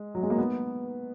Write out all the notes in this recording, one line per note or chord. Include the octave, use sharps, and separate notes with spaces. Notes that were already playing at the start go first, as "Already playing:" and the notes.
Already playing: G#3
F#3
G#3
A#3
B3